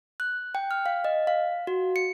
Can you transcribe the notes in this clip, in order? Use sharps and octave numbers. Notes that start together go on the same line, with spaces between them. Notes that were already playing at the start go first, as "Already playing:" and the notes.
F#6
G5
F6
F5
D#5
F5
F#4
C#7